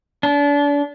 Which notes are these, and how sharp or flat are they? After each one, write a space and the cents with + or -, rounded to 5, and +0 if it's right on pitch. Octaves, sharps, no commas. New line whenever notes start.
D4 -35